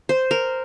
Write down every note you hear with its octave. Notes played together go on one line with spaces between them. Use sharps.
C5
A#4